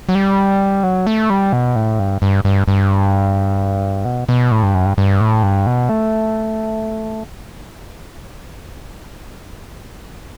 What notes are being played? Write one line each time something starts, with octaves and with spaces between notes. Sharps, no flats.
F#3
G3
F#3
A3
G3
B2
A2
G2
G2
G2
G2
B2
B2
A2
G2
F#2
G2
G2
A2
G2
B2
A3